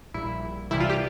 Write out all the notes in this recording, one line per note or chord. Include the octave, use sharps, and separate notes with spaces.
A#1 A#2 G3 E4
C2 C3 E3 G3 E4
F4
G4